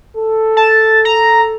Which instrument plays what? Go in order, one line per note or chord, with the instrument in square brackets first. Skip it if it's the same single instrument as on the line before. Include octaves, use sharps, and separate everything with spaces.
[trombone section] A4
[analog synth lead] A5
A#5